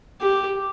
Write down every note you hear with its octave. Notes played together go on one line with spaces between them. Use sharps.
G4